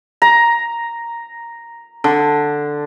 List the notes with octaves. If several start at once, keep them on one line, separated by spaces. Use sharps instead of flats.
A#5
D3